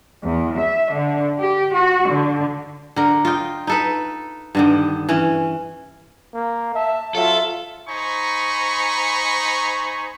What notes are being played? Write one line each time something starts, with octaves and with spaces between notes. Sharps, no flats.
E2
E5
D3
G4
F#4
D3
D3 A#4
F4 D#5 G5
D#4 A4 B4
G2 D3 D#3
E3 C#4
A#3
E5 A5
F#3 F4 A4 E5
D#4 C5 G#5 A#5 B5 C#6